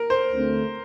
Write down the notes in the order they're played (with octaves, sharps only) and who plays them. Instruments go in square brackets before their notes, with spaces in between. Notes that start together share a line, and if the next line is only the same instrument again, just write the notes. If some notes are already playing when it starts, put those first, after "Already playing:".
Already playing: [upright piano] A#4
C5
[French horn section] D2 D3 A3 C4